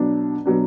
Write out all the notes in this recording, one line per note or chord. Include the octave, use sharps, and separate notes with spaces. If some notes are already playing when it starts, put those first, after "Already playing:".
Already playing: B2 F#3 D4
B2 F#3 D4